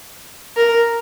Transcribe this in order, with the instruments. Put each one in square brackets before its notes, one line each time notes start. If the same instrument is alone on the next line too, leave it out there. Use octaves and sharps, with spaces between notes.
[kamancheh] A#4